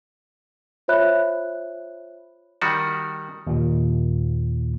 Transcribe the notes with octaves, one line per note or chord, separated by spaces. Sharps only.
F4 C5 C#5 E5 B5 F#6
D#3 G3 F#4
D#2 A#2